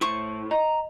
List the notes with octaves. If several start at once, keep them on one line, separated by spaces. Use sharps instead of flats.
A2 E4 C5 C#6
D#5 A#5